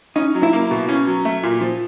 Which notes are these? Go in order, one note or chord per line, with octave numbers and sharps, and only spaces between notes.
C#4 D#4
F#3
E4
A#3
B2
C#4
F#3
A3
A#2
F3